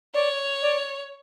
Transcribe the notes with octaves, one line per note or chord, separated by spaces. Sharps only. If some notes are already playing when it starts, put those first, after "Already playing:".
C#5 D5
D5